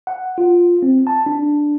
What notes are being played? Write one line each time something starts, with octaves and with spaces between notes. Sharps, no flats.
F#5
F4
C4
A5
D4